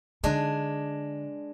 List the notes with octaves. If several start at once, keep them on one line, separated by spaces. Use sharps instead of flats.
D3 G#3 D4